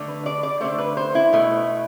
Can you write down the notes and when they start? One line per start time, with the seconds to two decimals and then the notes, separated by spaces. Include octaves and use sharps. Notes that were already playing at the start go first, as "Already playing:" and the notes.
Already playing: D3 A3
0.08 B4
0.26 D5
0.43 D5
0.60 D3 A3 C5
0.78 B4
0.97 C5
1.15 E4
1.33 B2 A3